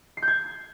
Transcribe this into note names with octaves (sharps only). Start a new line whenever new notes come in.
C7
G6
G#6